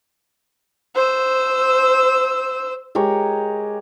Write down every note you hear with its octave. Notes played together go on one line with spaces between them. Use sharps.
C5 E6
G#3 G4 A#4 C#5